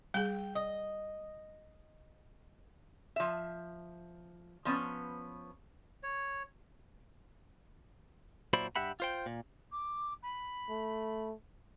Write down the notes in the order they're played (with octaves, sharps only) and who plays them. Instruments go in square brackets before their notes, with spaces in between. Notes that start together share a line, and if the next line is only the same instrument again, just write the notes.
[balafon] G3 G#4 [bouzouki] G5
[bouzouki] D#5
[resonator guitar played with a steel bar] F3 E5
F3 B3 C#4
[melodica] C#5
[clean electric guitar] A#2 F#3 E4 C5 D5 B5
G2 G4 E5 F#5 B5
F4 C5 G5
A#2
[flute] D6
B5
[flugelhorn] A3